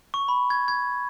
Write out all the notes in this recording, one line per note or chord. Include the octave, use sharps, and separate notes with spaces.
C#6
B5
G#6
G#6